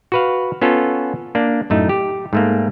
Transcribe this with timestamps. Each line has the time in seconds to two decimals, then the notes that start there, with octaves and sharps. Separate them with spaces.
0.12 F#4 B4 F5
0.62 B3 C#4 F4 A4
1.35 A#3 D4
1.70 F#2 A2 A3 D#4
1.89 G4
2.33 G#2 A3 A#3